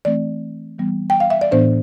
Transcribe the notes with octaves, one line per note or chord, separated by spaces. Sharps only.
E3 A3 C4 D5
E3 G3 B3
G5
F5
E5
D5
A2 E3 B3 D4 C5